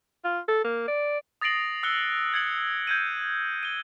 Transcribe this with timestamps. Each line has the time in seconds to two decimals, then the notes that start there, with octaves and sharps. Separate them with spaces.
0.24 F4
0.48 A4
0.64 A#3
0.88 D5
1.41 D#6 A6 A#6 C7 D7 F#7
1.83 E6 F#6 C#7 G7
2.33 F#6 G#6 A6 C#7 F#7
2.87 G6 G#6 D#7
3.63 D#7 G7